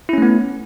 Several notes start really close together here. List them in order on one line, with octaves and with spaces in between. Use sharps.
E4 C#4 A3 B3